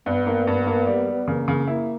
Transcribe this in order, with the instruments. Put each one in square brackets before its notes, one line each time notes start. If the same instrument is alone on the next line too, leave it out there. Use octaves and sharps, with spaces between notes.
[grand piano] G2 [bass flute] B3
[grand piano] A#3
G2
A#3
G3
G3
[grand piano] C#3 [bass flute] A#3
[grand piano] C#3
[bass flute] A#3 [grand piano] E4